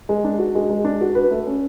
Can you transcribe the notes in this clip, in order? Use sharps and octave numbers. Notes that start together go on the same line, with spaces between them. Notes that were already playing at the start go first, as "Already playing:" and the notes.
G#3
D4
F#4
G#3
G#3
D4
F#4
B4
A3
C#4